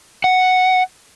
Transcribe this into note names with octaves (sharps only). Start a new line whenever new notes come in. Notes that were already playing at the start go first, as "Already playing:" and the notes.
F#5